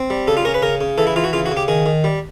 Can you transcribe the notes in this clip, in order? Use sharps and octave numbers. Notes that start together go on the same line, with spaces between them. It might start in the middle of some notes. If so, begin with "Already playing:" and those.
Already playing: C4
G3
C#3 A4
F4
C#4 A#4
B4
C#3 A#4
C#3
E3 A4
E4
E3 F4
F#4
C#3 F4
F#4
C#3
G4
D#3 G#4
D#3
G3